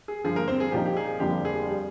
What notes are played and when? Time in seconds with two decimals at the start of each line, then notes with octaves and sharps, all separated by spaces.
0.08 G#4
0.24 G2 D3 F3 G#4
0.36 A#3 A#4
0.48 C4 C5
0.60 G#4
0.72 A#2 F3 C4 D#4 G4
0.86 G4
0.97 G#4
1.20 G1 F2 D3 F3 A#3 G4
1.45 G#4
1.69 G3